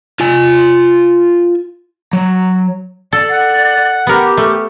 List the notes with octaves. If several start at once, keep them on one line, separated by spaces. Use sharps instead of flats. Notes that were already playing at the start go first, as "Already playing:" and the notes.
F4 G#5
F#3
A4 D5
F#5
B3 G4 A#4
A3 F6